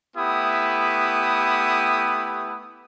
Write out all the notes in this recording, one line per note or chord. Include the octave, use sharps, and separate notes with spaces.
A3 B3 E4 G4 D#6